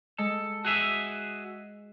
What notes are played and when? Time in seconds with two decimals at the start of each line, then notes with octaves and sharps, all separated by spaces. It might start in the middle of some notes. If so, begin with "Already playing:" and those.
0.18 G#3 A4
0.65 F#4 G#4 E5